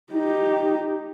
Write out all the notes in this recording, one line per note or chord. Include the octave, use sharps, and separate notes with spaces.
D#4 G4